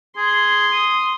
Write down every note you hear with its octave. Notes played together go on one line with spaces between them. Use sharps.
G#4 C6
D#6